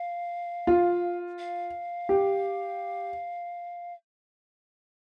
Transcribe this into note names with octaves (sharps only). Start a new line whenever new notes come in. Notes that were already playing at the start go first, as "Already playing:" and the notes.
Already playing: F5
F4
F5
G4